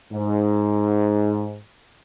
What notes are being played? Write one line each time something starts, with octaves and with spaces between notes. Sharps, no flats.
G#2